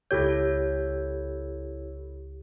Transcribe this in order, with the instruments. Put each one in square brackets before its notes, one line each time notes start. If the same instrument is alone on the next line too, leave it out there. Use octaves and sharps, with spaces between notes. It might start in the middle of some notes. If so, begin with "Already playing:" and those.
[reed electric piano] C#2 G4 G6 [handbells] E4 A4 C#5